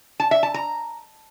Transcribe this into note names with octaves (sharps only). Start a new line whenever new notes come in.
A5
E5
A5
A#5